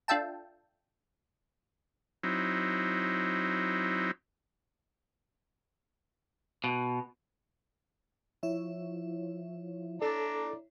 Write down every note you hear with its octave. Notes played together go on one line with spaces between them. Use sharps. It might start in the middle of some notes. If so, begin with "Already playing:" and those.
D4 F4 A4 E5 G5 A5
F#3 C4 D#4 E4
B2
F3 E4 C#5 E5
D4 A4 D5 A#5